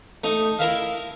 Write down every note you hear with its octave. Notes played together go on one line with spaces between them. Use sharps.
A3 D#4
E4 A#4 E5 F5